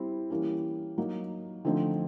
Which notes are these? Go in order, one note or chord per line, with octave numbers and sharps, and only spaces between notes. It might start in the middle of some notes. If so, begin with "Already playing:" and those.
Already playing: G3 C4 E4
E3 G3 A#3 C#4
F#3 A#3 D#4
D3 F3 A3 C4 D#4